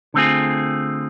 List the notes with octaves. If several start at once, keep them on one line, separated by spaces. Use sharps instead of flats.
D3 A3 C4 F4 G#4